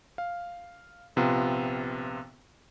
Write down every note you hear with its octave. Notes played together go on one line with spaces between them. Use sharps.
F5
A#1 C3 B3 F4 F5